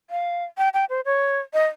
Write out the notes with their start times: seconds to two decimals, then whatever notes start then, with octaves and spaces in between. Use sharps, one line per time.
0.10 F5
0.58 G5
0.74 G5
0.90 C5
1.05 C#5
1.54 D#5